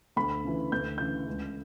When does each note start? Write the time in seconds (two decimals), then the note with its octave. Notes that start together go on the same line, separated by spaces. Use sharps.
0.16 D2 B5
0.44 C#3 E3
0.72 D2 G6
0.98 C#3 E3 G6
1.26 C#2